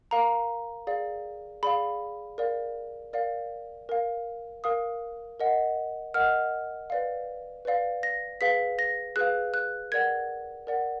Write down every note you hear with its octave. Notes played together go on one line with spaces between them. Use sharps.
A#4 F5 A#5
G#4 D5 F5
G#4 D5 F5 B5
A#4 D5 F5
A#4 D5 F5
A#4 F5
A#4 F5 D#6
A#4 D#5 F#5
A#4 D#5 F#5 F6
B4 D5 F5
B4 D5 F5
A#6
G#4 B4 F5 B6
A#6
G#4 B4 F5 F#6
F#6
A#4 D5 F#5 G#6
A#4 D5 F#5